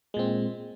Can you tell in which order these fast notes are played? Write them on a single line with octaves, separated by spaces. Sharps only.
G#3 A#2 C4